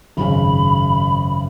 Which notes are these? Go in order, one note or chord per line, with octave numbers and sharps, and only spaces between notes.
G#1 F#2 C#3 B5